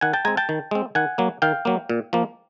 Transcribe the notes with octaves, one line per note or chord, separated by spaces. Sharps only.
D#3 F#5 G#5
G5 A5
G#3 C4 G#5 A#5
G5 A5
D#3
G#3 C4
D#3 F#5 G#5
F#3 A#3
D#3 F5 G5
F#3 A#3
A#2
F3 A#3